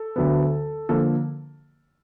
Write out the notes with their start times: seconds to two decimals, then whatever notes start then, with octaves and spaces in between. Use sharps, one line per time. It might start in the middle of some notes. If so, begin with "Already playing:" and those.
Already playing: A4
0.16 D2 D3 F#3 B3
0.89 D3 F3 A#3 A4